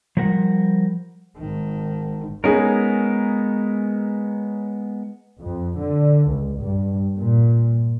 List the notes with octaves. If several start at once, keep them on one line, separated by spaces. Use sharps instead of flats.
F3 G3 A#4 F#5
G#1 D#3
G#3 B3 C#4 D#4 G#4 A#4
F2
D3
C#2
G2
A#2